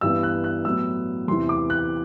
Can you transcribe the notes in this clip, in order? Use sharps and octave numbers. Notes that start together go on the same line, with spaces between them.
G2 E3 B3 E6
F#6
F#6
A2 F#3 B3 E6
E2 C3 E3 C6
D6
F#6